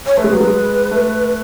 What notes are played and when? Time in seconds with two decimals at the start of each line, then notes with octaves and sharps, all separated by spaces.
0.06 C#5
0.17 A3 B4
0.24 G#3
0.33 F#3
0.40 G#3
0.91 A3